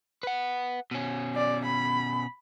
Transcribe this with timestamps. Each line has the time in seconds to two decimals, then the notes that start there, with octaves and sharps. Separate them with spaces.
0.23 B4 F#5
0.91 B2 C#4
1.35 D5
1.66 B5